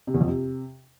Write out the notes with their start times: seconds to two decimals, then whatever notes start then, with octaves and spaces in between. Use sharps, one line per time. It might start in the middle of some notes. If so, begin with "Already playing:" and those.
0.07 C3
0.14 E2
0.21 F2
0.28 C3